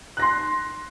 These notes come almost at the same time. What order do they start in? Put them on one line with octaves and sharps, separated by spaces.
F#6 A#6 C6